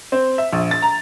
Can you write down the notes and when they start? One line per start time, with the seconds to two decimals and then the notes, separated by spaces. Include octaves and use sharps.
0.12 C4
0.38 E5
0.53 A#1
0.71 A6
0.82 A#5